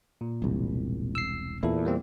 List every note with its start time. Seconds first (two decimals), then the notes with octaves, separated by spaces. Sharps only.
0.21 A#2
0.42 E1 C2
1.15 E6 C7
1.63 E2 A#2 E4 A4
1.85 G3 A#3 C4